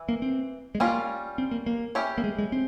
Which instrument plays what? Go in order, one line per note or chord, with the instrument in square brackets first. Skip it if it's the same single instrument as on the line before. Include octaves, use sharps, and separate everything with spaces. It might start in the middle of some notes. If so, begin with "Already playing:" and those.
Already playing: [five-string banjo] E3
[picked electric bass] A#3
C4
G#3
[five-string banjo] G3 C#4 F4 [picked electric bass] A#3
[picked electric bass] C4
A#3
A#3
[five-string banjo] C#4 E4 G4 C#5
[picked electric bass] A#3
G#3
G#3
C4